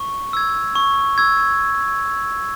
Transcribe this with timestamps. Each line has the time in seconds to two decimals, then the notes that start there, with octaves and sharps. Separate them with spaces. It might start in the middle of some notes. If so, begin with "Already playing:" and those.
Already playing: C#6
0.33 E6 G#6
0.75 C#6
1.18 E6 G#6